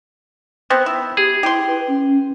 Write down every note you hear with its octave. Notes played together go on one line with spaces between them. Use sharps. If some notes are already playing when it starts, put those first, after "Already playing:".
B3 C4
E4
G4 G#4
E4 G4 C6
B4
C#4